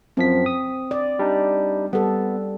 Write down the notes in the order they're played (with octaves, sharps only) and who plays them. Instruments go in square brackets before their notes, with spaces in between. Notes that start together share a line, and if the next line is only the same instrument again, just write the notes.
[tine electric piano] F#2 F3 B6 [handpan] C4
[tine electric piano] D#6
[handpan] D5
[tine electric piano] G3 D4 D#4
[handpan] G3 A4 [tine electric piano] B3